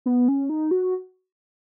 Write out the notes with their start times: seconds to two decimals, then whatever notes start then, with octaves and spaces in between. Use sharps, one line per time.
0.06 B3
0.28 C#4
0.49 D#4
0.71 F#4